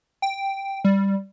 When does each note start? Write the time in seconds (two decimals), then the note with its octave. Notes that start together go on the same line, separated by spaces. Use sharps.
0.22 G5
0.85 G3